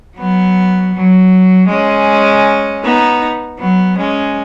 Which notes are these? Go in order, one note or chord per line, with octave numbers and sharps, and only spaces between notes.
F#3 B3
F#3
G#3 C#4
B3 D#4
F#3 B3
G#3 C#4